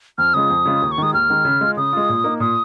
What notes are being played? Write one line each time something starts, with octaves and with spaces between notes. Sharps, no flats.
F2 F6
C#3 G#3 F4 D#6
F2
C#3 G#3 F4
D#2
C#6
D#3 G#3 D#6
D#2 F6
D#3 G#3
C#3
G#3 F4
C#3 D#6
G#3 F4
A#2
A#3 D#4
A#2 D#6